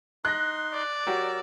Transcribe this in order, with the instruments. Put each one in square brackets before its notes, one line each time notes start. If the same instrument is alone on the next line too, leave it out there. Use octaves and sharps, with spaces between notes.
[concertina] D#4 C6 [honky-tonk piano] F#6 A#6
[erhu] D5
[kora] F#3 G4 [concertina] A#4 E6